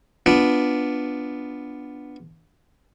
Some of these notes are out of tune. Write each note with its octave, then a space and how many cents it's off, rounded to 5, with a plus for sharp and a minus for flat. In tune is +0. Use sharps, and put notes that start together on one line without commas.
B3 +0 D4 +0 F4 +0